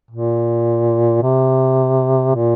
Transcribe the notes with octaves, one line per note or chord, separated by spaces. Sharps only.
A#2
C3
A#2